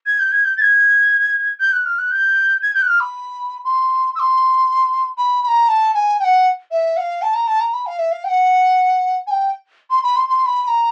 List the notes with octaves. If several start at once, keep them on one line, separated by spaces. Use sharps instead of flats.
G#6
G6
G#6
G6
A6
G#6
G6
F#6
F6
F#6
G6
G#6
G6
F#6
F6
B5
C6
E6
C6
B5
B5
A#5
A5
G#5
G5
F#5
E5
F#5
F5
A5
A#5
A5
A#5
B5
F5
E5
F5
G5
F#5
G#5
G5
C6
B5
C6
C6
B5
B5
A#5